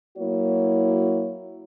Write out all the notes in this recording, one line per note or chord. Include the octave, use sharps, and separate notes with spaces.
F#3 A#3 E4 F#4 C#5